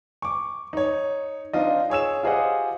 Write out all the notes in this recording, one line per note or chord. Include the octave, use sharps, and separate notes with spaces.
C#6 D6
D#4 C#5
C4 D4 D#4 F4 D#5
G#4 C#5 E6 E7
F4 G4 G#4 C5 D#5 F#5